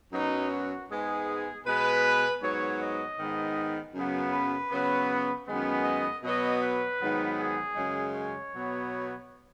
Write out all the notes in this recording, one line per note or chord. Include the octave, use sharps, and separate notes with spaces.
F#2 F#3 B3 D#4
F#4
G#2 G#3 B3 G#4
B2 G#3 B3 B4
G#2 F#3 B3 C#5
D#5
G#2 D#3 B3
F#2 C#3 F#3 B3
B4
C#3 F#3 B3
F#2 D#3 G#3 B3
D#5
B2 F#3 B3 D#5
B4
G#2 D#3 F#3 B3
G#4
F#2 C#3 G#3
C#5
B2 F#3 B3